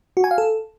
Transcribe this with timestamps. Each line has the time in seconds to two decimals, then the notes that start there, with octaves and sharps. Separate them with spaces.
0.17 F#4
0.24 G#5
0.31 F5
0.38 A4